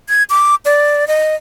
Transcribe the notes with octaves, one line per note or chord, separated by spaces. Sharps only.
G#6
D6
D5
D#5